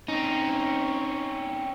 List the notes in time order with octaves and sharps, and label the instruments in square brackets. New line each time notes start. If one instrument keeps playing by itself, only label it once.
[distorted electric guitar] C4 C#4 [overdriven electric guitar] D#4